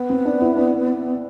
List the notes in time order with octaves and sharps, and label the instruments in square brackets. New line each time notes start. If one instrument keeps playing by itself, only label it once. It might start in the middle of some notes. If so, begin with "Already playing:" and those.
Already playing: [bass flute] B3
[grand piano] C4
D4
E4
D4